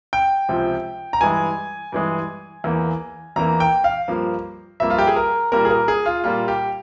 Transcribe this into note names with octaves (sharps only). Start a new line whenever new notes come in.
G5
C#2 C3 F3
A#5
G2 E3 G#3 G#5
G2 E3 G#3
E2 E3 A#3
E2 E3 A#3 A#5
G5
F5
G2 F3 A#3
G2 F3 A#3 E5
F4
G4
G#4
A#4
A#2 G3 A#3 A#4
G#4
A#4
G#4
F4
A#2 G3 A#3 F4
G4